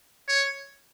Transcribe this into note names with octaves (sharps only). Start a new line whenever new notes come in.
C#5